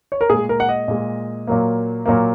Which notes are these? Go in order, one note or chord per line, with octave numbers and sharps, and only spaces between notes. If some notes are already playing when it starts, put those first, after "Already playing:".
C#5
A#4
A#2 G#3 G#4
A#4
F#5
D#5
A#2 G#3
A#2 F#3 A#3
A#2 F#3 A#3